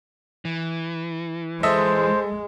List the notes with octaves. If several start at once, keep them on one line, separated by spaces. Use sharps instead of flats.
E3
G#3 A4 C5 D#5 E5